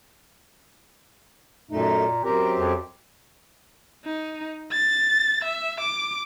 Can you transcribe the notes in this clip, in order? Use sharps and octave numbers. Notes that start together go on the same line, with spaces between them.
F#2 A#2 A3 D#4
F#2 C4 G4 A#4
F2
D#4
A6
E5
D6